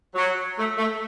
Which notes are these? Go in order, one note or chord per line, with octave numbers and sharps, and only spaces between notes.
F#3
A3
A3